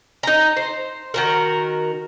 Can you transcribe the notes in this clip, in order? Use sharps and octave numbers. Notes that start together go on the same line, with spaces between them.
D#4 A#5
C5
D#3 F#4 A#4